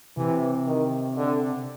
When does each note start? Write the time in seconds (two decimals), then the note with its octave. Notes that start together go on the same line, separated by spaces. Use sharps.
0.17 C3 E3
0.67 D#3
1.17 D3